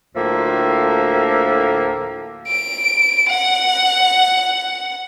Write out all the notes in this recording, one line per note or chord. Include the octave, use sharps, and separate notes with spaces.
D2 A2 F3 A#3 A4 E5
D7
F#5